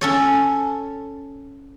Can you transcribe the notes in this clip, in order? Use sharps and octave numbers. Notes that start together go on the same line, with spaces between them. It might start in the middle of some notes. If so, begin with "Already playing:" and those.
C#4 A4 C#5